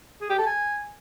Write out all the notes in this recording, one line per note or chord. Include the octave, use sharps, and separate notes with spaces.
G#4
G4
A4
G#5